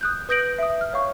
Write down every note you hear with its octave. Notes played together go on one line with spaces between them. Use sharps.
D#6 F#6 G6
B4 D#6 G6 A#6 D7 F#7
E5 D#6
F6
C#5 F5 C#6